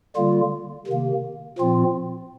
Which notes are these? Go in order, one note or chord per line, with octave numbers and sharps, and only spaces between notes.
D3 G3 A#3 F4
C3 D#3 A#3
A#2 F3 C4 F4